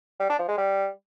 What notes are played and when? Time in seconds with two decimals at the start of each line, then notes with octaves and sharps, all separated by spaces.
0.20 G3
0.29 D4
0.39 F3
0.48 G#3
0.58 G3